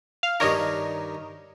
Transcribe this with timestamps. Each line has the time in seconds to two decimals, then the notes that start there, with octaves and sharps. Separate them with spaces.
0.23 F5
0.40 G2 D#3 D4 A#4 C#5 D#5